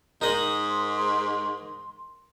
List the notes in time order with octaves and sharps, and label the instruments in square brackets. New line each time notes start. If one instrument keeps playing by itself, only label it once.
[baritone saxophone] G#2 [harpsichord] D#4 D#5 [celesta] A#4 F#7 [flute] C6